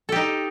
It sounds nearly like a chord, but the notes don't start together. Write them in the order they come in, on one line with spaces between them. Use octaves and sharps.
A4 G4 D#4